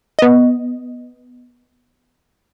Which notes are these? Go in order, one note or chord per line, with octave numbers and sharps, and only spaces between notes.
B3 D#5